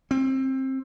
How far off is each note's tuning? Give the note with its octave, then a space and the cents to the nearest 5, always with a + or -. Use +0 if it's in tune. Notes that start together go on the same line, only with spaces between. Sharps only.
C4 +20